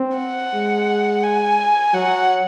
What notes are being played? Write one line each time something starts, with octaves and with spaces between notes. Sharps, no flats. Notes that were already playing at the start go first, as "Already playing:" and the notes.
Already playing: C4
F#5
G#3
G#5
F#3 F#5